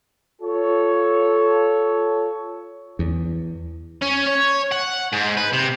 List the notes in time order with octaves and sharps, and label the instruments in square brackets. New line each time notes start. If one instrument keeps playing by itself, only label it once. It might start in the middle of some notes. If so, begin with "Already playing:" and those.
[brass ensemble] F4 A4 C#5
[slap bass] E2
[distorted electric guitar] C#4
C#5
F#5
G#2
B4
C3